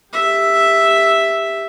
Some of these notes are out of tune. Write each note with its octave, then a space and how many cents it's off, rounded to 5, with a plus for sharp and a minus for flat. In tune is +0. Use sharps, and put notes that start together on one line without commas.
G4 +20 E5 +0